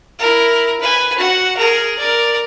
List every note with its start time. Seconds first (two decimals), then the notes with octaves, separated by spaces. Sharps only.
0.19 E4 A#4
0.80 B4 G#5
1.18 F#4 F#5
1.57 G#4 A#4
1.99 A#4 D5